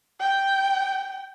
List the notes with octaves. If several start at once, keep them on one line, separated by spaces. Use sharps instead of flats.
G5